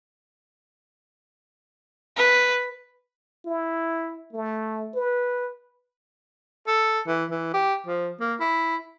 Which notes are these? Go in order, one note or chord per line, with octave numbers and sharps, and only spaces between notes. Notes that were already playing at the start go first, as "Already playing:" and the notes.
B4
E4
A3
B4
A4
E3
E3
G4
F3
A#3
E4